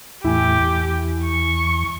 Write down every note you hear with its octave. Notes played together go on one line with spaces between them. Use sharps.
E2 A2 E4 G4 G#5
E2
C#6